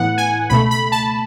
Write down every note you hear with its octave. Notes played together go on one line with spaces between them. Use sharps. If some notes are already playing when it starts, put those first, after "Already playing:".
Already playing: A2 E3 B3 F#5
G#5
C#2 B2 A3 B5
B5
A5